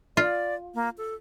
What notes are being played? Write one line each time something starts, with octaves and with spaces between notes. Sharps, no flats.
F4 D5
A#3
A4